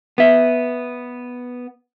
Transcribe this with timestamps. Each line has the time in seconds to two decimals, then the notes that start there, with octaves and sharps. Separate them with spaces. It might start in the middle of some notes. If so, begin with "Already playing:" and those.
0.18 B3 E5